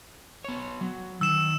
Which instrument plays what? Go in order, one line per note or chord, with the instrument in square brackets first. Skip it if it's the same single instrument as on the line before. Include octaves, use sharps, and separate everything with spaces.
[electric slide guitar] B3 C#5
F#3
[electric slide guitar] D#3 [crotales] E6 E7